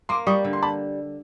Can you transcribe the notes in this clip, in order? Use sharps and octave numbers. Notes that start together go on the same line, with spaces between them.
A#3 C6 D6
G3 C#6 D#6
D3
C6
A5 B5